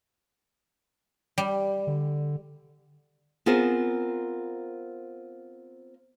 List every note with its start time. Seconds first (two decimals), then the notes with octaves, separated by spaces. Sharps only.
1.38 G3
1.87 D3
3.46 B3 C4 F4 G#4 A#4 C5